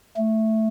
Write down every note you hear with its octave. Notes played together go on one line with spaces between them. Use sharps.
A3